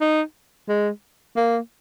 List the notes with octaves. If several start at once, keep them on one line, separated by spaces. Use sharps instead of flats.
D#4
G#3
A#3